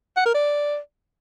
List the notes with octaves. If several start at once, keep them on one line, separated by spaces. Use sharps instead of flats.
F#5
A#4
D5